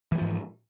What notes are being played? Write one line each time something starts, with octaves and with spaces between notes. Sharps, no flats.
G#2 E3 F3 G3